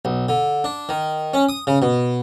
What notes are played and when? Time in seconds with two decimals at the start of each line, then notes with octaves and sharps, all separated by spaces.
0.05 B1
0.29 D3
0.64 D4
0.89 D#3
1.34 C#4
1.49 D#6
1.67 C#3
1.82 B2